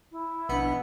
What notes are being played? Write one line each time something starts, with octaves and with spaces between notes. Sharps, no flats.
E4
A#1 B2 B3 D4 B5 C#7